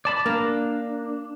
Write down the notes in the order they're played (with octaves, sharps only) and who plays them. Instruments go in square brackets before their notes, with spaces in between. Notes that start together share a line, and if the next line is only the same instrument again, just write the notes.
[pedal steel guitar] D5 A5 B5
[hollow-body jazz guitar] A#3 [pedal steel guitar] D4